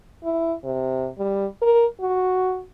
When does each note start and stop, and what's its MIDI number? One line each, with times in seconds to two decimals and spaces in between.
0.23 0.54 64
0.63 1.08 48
1.18 1.46 55
1.62 1.85 70
2.00 2.63 66